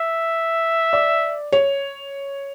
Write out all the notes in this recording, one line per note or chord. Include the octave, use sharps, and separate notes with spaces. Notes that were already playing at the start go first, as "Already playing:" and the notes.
Already playing: E5
D5
C#5